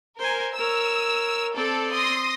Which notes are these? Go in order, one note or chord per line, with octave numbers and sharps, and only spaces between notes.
A#4 C5 G#5
A#4 C#5 E6
C4 A4 D5
C6 D#6 A#6